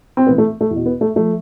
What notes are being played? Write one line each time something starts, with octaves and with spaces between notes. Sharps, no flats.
C4
A2 E3 B3
A3
A3
E2
B2
B3
A3
F3 A3